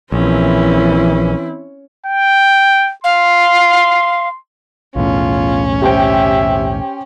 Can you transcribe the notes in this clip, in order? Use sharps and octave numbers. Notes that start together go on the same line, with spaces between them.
A#1 E3 C4 C#4 E4
G5
F5 C6
B1 E2 A2 C#4 F4
G4 C5 E5 G5